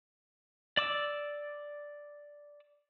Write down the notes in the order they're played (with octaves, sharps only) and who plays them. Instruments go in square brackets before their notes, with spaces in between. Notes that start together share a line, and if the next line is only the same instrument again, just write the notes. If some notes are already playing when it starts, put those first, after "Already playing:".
[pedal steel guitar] D5 D6 E6